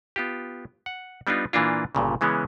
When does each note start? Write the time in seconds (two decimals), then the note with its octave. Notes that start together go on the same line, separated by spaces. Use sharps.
0.16 B3 F4 G4
0.86 F#5
1.27 G3 B3 D4 D#4 F4
1.53 A#2 E3 A#3 D4 F4
1.95 G1 G2 A#2 C#3
2.21 C#3 E3 G#3 B3 C#4